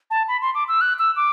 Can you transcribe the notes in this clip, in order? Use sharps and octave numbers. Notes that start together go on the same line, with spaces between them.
A5
B5
C6
D6
E6
F#6
E6
D6